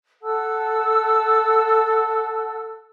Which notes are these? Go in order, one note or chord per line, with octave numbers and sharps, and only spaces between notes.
A4 F#5 A5 E6